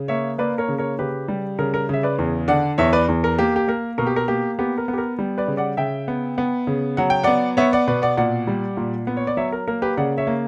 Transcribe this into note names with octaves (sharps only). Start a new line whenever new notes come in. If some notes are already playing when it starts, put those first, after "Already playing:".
Already playing: C#3
A#3 C#5 E5
A#3 B4 D5
A#4 C#5
C#3
A#4 C#5
C#3 G4 B4
G3
C#3 A#4
A#4
C#3 E5
B4 D5
E2
D3 D5 F#5
E2 C#5 E5
B4 D5
E2
A#4
A#3 G4
G4
A#3 A#4
B2 A#4
G4
A#4
A#3 G4
B3 G4
A#4
B3
G4
A#4
G3
B4 D5
C#3
D5 F#5
C#3 E5 G5
B3
B3
C#3
F#3 F#5
G5
B3 D5 F#5
B3 C#5 E5
D5 F#5
B2 B4 D5
D5 F#5
A#2 D5 F#5
G3
A#2
B3
C#5
D5
F#3 C#5 E5
A#4
A#3 A#4
G4 B4
C#3 D5 F#5
C#5 E5
A#3